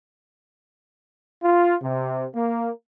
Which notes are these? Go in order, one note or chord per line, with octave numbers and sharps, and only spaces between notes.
F4
C3
A#3